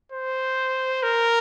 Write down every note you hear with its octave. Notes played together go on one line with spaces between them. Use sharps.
C5
A#4